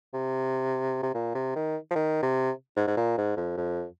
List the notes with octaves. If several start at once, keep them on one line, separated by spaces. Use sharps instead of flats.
C3
C3
A#2
C3
D#3
F3
D#3
C3
G#2
G#2
A#2
G#2
F2
F2